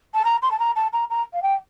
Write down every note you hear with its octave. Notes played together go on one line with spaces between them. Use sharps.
A5
A#5
C6
A5
A#5
A5
A#5
A#5
F5
G5